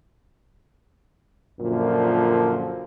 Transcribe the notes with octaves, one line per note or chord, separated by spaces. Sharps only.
F#2 A#2 D3 F3